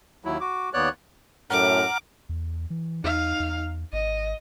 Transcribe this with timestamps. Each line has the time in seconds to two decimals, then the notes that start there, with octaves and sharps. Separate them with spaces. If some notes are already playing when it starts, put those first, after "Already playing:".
0.25 D#2 F#3 E4
0.41 F#4 D6
0.74 D#2 B3 C#5 D5 F#6
1.50 F#2 A2 F#5 A#5 D6 F6
2.29 E2
2.70 E3
3.04 E2 D#4 F5
3.40 E2
3.92 G#1 D#5